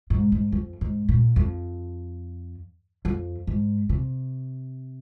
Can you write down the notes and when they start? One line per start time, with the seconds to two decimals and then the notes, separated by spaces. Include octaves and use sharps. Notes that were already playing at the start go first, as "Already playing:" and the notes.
0.10 G#2
0.32 G#2
0.52 F2
0.81 G#2
1.09 A#2
1.36 F2
3.05 F2
3.47 G#2
3.89 C3